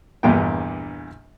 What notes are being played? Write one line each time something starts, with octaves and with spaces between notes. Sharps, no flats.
A#1 E2 G2 A#2 D4 G5